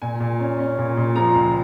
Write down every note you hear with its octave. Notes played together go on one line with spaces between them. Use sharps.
A#2 G#5
A#2
C#4
C#4
A#2
A#2
F3 A#5
C#2